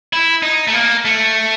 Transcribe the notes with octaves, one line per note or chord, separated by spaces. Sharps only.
E4
D#4
A3
A#3
A3